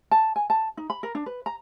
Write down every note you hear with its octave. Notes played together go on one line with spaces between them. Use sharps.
A5
G#5
A5
D#4
B5
A#4
D4
B4
A#5